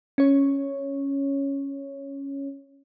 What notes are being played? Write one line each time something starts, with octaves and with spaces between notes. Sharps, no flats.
C#4 C#5